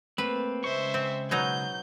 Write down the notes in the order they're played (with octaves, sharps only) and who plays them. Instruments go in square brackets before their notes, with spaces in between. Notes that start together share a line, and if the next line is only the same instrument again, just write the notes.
[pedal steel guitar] A3 A#3 C4 [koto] B4
[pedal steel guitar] C#3 G#3 C#6 [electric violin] C5 E5
[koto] C4
[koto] B2 F#3 D#4 [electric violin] G6